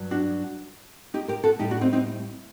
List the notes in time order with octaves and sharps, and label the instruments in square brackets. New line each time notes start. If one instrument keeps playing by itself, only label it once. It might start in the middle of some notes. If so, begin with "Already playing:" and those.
Already playing: [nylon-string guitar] G2 F#3
D4 F#4
D#4 G4
G4 A#4
F#4 A4
A2 G3 D#4 G4
D4 F#4
C4 D#4
C4 D#4